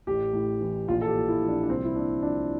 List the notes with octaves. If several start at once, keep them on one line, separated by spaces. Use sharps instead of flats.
A1 G4
A2
E3
A#1 F4
A4
G4
A#2
E4
F3
D4
D4
C2 C4
E4
A#2 D4
F3 D4